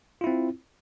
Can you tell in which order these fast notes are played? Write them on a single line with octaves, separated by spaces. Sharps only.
F4 E4 C4